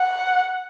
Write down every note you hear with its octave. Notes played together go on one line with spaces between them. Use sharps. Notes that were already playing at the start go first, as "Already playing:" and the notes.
Already playing: F#5